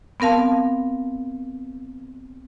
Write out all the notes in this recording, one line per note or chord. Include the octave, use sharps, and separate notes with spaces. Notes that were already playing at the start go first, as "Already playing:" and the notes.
B3 C4 A#4 F5 A5